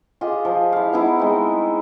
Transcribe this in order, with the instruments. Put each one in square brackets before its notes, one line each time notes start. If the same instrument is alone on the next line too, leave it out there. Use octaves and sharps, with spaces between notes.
[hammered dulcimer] F4 G4 G#4 D#5
F3
E4 F5
B3 D#4 E4
G#3 C4